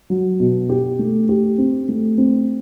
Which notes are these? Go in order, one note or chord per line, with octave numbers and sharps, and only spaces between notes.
F#3
B2
G4
A3
G4
C4
A3
C4